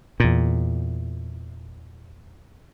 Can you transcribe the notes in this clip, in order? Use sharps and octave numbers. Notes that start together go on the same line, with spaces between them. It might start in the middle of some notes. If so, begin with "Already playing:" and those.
E2 A#2